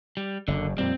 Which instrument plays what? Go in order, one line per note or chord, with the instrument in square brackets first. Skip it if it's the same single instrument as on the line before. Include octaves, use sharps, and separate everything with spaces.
[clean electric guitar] G3
[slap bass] F#1 F#2 [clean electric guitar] D3
[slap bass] F2 A#2 G3 [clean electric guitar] C4